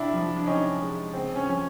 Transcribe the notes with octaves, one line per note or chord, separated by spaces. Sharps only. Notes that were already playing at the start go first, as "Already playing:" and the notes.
Already playing: C3 D4 E4
F3
D4
C3 C#4 D#4
G#3
C#3 C4
C#4
F3 C#4